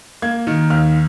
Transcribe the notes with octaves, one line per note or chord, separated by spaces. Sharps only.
A#3 G#6
D#3
D#2 F6